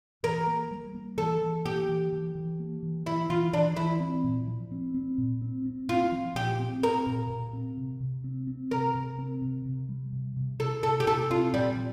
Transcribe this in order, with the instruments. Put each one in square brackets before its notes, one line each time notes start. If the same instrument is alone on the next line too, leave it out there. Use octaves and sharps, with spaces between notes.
[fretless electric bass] E3 [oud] A#4
[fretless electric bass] A#3
G3
A#3
[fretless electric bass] E3 [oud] A4
[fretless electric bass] E3
[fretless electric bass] A#3 [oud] G4
[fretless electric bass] E3
E3
E3
A#3
E3
[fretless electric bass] E3 [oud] E4
[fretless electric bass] E3 [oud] F4
[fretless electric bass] E3 [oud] D4
[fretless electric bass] E3 [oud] E4
[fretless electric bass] C4
A#2
F3
C4
C4
A#2
C4
C4
[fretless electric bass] C4 [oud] F4
[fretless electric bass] F3
[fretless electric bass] A#2 [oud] G4
[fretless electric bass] C4
[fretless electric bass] C4 [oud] A#4
[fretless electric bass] A#2
A#2
C4
C3
C3
C4
C4
[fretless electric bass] C3 [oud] A#4
[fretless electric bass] C3
C4
C3
C3
G3
C3
C3
[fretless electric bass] C3 [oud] A4
[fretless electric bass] C3 [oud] A4
[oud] G4
[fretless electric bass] C3 [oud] A4
[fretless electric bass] C4 [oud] F4
[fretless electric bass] A#2 [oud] G3
[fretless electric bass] F3